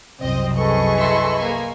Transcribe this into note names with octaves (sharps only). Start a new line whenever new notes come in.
C2 F#2 C4 D#5
G#4 A4 B4 D#5 C#6
E4 C6
A#3 G#5